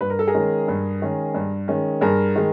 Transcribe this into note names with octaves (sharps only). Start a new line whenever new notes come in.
G2 B4
A#4
A4
G#4 A#4
D#3 G#3 C#4
G2
D#3 G#3 C#4
G2
D#3 G#3 C#4
G2 G#4 A#4
D#3 G#3